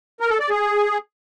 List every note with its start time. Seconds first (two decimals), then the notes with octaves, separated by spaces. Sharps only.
0.20 A#4
0.30 A4
0.40 D5
0.50 G#4